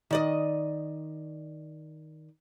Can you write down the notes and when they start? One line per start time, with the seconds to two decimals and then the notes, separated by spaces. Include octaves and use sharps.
0.11 D#3 D5 D#5